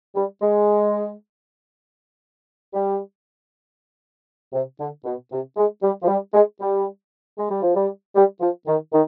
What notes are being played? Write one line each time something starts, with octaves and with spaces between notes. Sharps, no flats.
G3
G#3
G3
C3
D3
B2
C3
G#3
G3
F3
G3
G#3
G3
G#3
G3
F3
G3
G3
F3
D#3
D#3